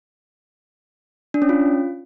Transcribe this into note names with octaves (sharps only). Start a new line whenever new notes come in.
D4
C#4
F4